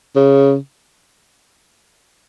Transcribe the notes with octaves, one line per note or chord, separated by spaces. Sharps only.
C#3